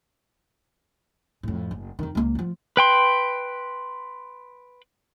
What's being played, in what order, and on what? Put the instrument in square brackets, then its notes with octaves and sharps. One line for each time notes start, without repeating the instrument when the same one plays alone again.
[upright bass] F2 A2
F#1
F2 D#3
C#2 A#3
D#3 F3
[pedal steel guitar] B4 G5 C6